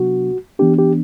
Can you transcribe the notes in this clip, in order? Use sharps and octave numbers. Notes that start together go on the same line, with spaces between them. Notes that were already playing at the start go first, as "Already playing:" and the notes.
Already playing: C3 F#3 B3 D4 F#4
E3 B3 D4 G4
G4